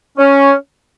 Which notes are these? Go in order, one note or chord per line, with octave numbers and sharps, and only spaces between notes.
C#4